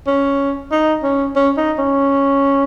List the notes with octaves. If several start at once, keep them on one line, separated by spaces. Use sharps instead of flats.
C#4
D#4
C#4
C#4
D#4
C#4